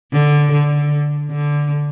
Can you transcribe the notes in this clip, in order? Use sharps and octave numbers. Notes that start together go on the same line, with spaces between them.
D3
D3
D3